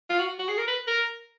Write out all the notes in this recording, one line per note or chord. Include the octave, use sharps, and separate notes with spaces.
F4
F#4
F#4
G#4
A#4
B4
A#4